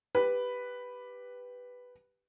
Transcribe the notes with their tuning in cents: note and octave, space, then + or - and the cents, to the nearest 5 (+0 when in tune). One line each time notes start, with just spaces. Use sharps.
G4 +0 B4 +0